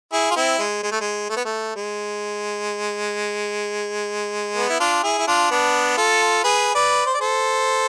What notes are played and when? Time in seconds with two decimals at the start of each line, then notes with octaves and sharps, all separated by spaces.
0.13 E4 G#4
0.31 F4
0.36 C4 E4
0.59 G#3
0.83 G#3
0.92 A3
1.01 G#3
1.30 A3
1.37 B3
1.45 A3
1.76 G#3
4.56 B3
4.70 E4
4.80 D4 F4
5.03 E4 G#4
5.19 E4
5.27 D4 F4
5.51 B3 D4
5.97 F4 A4
6.44 G#4 B4
6.75 B4 D5
7.06 C5
7.14 D5
7.21 A4 C5